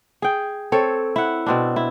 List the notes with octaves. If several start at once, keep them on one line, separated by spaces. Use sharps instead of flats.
G#4 G5
C4 A4 C5 C#5
E4 F#5
B2 C4 D4
E4